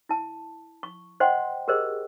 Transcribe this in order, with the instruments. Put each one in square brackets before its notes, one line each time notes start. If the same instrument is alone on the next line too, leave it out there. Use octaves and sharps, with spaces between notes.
[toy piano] E4 A5
C#6
C5 D#5 F#5 G5 C6
G4 G#4 A#4 C5 D#5